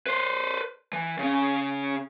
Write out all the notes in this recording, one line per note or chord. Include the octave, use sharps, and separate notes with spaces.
B4 C5
E3
C#3 C#4